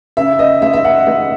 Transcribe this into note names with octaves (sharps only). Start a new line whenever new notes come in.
C#3 E5
D#5
G#3 E5
E5
F#5
G#3 E5